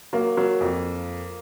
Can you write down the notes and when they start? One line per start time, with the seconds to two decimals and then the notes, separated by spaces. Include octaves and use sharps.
0.13 F#3 A#3
0.37 F#3
0.61 F2